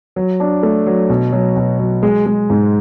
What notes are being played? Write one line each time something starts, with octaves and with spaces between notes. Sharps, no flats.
F#3
D4
A3
F#3
B2
F#3
B2
F#3
G#3
G#3
G#2